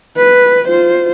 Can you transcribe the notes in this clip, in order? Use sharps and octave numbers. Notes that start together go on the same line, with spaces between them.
B4
F4 C5